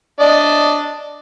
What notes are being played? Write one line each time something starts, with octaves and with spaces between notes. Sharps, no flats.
D4 D5 D#5